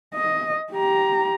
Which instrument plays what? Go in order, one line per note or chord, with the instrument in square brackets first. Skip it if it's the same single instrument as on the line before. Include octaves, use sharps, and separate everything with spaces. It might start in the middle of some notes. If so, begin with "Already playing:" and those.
[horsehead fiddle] D#5
G4 A#5